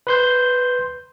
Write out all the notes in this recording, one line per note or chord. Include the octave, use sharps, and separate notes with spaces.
B4 C6 G6